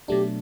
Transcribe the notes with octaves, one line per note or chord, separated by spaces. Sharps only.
B2 F#3 A3 D4 G4